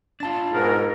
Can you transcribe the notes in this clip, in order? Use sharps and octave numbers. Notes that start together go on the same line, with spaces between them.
D4 F4 A5 A6
G#2 B2 B3 A#4